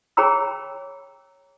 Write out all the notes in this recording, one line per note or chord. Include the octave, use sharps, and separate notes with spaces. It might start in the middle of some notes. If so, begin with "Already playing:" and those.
G#4 C#5 G5 A#5 B5 E6